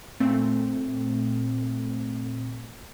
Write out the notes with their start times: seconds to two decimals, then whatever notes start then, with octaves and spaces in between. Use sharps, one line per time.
0.20 A#2 A3 C4